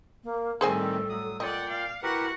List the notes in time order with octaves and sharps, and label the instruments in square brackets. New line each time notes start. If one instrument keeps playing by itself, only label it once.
[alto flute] A#3
[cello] A2 G3 [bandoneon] D#3 C4 [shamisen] G#4 C5 G#5 [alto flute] A4
[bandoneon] F#3 D#6
[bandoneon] A#2 G5 [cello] D5 F#5 [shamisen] D#5
[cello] F5
[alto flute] E4 [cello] F#4 F#5 [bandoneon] G4 A#4 B4